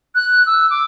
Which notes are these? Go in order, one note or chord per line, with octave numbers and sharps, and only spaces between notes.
F#6
E6
D6